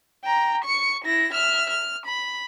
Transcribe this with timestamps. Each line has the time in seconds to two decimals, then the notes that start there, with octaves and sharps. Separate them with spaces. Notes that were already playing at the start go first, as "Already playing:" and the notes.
0.25 G5 A#5
0.64 C#6 C#7
1.04 E4 A#6
1.33 E5 F6
1.70 F6
2.06 B5